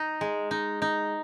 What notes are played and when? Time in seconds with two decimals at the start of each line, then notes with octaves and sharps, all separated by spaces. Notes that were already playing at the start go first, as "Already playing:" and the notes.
Already playing: D#4
0.21 G#3
0.51 D#4
0.82 D#4